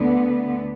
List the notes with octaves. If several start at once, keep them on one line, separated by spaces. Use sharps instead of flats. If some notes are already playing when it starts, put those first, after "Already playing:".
Already playing: D2 D3 B3